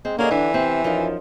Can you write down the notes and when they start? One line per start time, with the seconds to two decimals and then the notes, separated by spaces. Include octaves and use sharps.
0.05 G#3 C4
0.19 D3 A#3 C#4 G#4 D#5
0.31 E3 D4
0.54 C3 C4
0.84 F#2 F3 D#4 F4